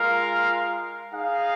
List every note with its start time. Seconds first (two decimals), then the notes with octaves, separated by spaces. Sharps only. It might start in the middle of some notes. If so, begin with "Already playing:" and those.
Already playing: G#3 F4 A#4 F5
1.12 D#4 G#4 F5